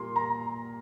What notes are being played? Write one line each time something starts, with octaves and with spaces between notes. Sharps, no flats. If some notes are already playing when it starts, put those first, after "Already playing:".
Already playing: A#2 G3 A#3 C6
A#5